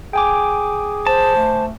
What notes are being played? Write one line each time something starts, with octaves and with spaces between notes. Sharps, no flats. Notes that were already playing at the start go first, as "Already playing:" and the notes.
G#4 G5 G#5 D6
C5 A5
A3